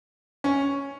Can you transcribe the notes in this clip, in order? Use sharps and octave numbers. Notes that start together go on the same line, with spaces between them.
C#4